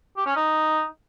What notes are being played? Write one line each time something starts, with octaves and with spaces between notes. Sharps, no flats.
G4
C#4
D#4